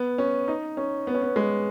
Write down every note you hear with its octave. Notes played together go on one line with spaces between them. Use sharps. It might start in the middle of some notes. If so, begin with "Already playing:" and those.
Already playing: B3
C#4
D#4
C#4
B3
C#4
B3
G#3